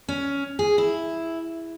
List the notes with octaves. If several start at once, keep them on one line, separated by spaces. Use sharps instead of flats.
C#4
G#4
E4